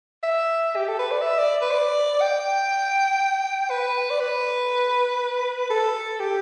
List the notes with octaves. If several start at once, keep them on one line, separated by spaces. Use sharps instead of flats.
E5
G4
A4
B4
D5
E5
D5
B4
D5
G5
B4
D5
B4
A4
G4